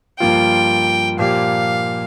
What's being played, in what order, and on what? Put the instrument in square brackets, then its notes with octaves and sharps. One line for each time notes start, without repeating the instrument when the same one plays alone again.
[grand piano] G2 F3 A#3 F4 [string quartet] G5
[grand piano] A#2 F3 A#3 G4 [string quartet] F5